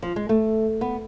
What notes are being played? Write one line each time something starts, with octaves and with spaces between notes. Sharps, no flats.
F3
G#3
A3
B3